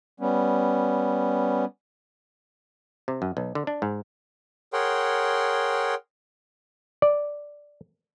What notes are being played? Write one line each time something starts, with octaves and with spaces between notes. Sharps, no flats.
G3 B3 C#4
C3
F#2
B1
D3
D4
G#2
G#4 A#4 C#5 F#5 G5 C6
D5